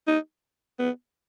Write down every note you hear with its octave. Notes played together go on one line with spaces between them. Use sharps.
D#4
B3